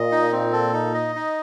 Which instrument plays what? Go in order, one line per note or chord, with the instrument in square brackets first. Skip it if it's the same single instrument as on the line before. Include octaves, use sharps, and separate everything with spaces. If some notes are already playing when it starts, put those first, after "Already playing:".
Already playing: [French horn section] A#2 [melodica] D#5
[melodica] D#4
C4
A4
D#4
D#5
D#4